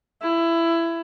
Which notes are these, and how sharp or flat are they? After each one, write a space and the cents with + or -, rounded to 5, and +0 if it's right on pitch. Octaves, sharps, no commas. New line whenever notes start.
E4 +20